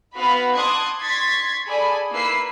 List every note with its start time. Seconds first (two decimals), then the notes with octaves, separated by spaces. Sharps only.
0.15 B3 F#4 B4 F5 B5
0.55 A5 C6 D6 D#6 F#6 G#6
1.00 C6 C#6 G#6 A6 B6
1.66 G#4 A4 D5 G#5 B5
2.12 A#3 E4 B4 E6 C7